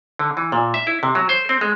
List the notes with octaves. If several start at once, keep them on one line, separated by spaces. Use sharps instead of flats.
D3
E3
A#2
E5
E4
C3
F#3
C5
C4
G#3